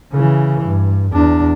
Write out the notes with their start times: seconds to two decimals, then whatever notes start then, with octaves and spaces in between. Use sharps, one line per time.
0.13 C#3 E3
0.65 G2
1.13 E2 D4